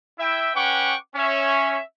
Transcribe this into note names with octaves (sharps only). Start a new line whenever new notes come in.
E4 E5 G5
C#4 B4 F#5 G5 C#6 D6
C#4 C#5 E5